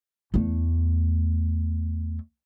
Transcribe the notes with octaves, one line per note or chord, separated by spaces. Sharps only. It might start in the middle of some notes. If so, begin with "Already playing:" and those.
E2 A3